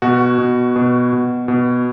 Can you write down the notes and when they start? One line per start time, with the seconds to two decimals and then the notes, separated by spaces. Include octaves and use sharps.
0.02 B2 F#4
0.38 B2
0.76 B2
1.13 B2
1.48 B2